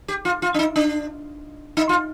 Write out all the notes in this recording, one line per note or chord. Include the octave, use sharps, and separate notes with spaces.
G4
F4
F4
D4
D#4
D4
D#4
F4